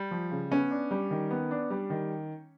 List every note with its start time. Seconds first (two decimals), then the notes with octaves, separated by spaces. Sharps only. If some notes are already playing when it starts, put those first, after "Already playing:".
Already playing: G3
0.11 F3
0.31 C#3
0.51 B3 C#4
0.71 D4
0.91 G3
1.11 D#3
1.31 B3
1.51 D4
1.70 G3
1.90 D#3